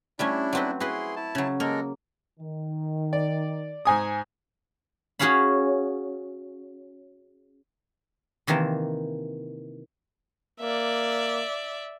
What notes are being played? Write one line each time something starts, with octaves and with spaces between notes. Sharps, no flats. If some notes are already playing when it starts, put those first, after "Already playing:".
G3 A3 C#4 D4 E4
F#3 C4 B4
E4 F#4 G#4 B4 C6
E4 A5
C#3 F#3
G#3 A#3 A4 A#4
D#3
D5
G#2 G#5 D#6
C#4 F#4 G#4 C#5 F5 B5
C3 D#3 E3 A#3 A5
A#3 D5 E5